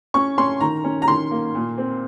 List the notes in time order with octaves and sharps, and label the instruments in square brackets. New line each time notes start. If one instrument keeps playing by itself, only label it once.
[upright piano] C#4 C#6
C#4 C6
D#3 A#5
C#4
A#5
D#3 C6
A#3
A#2
C4